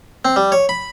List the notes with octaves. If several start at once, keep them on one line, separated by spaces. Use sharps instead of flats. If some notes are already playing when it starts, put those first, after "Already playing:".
C4
G3
C#5
B5